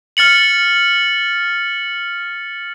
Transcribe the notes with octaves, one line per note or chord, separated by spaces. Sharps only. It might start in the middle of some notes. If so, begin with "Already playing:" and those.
F6 A6 C#7 F#7